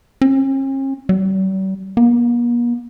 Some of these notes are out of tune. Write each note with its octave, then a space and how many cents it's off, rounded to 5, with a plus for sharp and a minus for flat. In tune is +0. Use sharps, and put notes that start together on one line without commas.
C#4 -45
G3 -45
A#3 +45